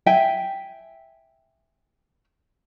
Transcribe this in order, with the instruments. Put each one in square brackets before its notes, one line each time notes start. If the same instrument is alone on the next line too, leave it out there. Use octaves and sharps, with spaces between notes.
[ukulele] E5 G5 G#5